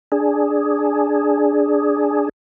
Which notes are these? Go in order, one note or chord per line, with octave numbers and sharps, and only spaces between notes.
D4 G#4